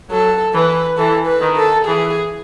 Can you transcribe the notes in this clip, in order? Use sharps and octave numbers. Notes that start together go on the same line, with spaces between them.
F#3 A4
E3 B4
E3 A4
B4
D#3
A4
E3 G#4